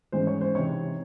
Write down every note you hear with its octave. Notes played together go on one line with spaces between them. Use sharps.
G#2 E3 G#3 C#4 C5
C#5
C5
C3 E3 C4 D#4 C#5